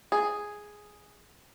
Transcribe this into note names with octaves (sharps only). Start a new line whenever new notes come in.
G#4